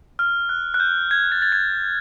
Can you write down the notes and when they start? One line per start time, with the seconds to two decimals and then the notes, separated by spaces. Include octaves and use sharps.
0.19 F6
0.49 F#6
0.74 F#6
0.80 G6
1.11 G#6
1.32 A6
1.42 A6
1.52 G#6